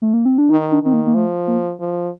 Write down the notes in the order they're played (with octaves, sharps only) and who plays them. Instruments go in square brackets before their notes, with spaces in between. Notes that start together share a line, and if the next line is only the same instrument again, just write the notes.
[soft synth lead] A3
A#3
C4
D4
[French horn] D#3 [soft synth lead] D#4
[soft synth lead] D4
[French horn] D#3 [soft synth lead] C4
[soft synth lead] A#3
A#3
[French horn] F3 [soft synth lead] A3
[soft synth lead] A#3
[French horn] F3